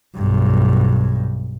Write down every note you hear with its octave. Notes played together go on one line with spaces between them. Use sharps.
B1 G2